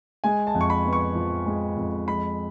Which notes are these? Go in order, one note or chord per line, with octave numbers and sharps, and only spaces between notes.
G#3 G#5
A5
F2
C#6
B5
B3
C#6
F3
G#3
F2
G#3 B5